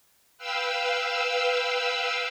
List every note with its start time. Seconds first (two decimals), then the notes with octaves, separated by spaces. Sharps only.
0.38 B4 F5 G5 E6